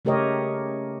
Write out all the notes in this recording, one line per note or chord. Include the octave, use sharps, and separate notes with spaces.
C#3 A3 G4 A#4 C#5 D#5